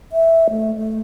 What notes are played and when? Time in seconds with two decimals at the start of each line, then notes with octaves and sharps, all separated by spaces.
0.12 E5
0.50 A3
0.76 A3